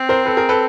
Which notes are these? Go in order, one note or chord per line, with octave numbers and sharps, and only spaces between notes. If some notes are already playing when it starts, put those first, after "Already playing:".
Already playing: C4
A#4 C5
A4 B4
G#4 A#4
A4 B4